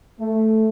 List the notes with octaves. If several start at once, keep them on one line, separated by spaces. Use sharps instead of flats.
A3